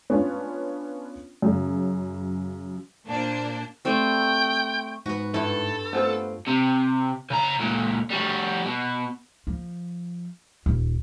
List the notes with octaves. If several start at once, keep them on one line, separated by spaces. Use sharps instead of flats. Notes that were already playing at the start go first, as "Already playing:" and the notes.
B3 C#4 D4 F4
F#2 C#3
A#2 A#3 D4 C5
G3 A3 C4 G5
G#2 B3 F#4
G2 E4 A4
A3 B3 C4 F4
C3
C#3 A#5
C#2 A#2
G3 F#4
B2
F3
D#1